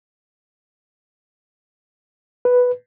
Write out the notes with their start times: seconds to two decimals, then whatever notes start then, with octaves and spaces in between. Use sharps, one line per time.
2.45 B4